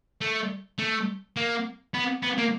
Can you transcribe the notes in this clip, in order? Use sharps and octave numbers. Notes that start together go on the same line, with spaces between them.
A3
A3
A#3
B3
B3
A#3